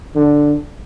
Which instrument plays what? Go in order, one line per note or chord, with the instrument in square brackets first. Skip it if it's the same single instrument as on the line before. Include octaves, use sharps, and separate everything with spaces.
[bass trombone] D3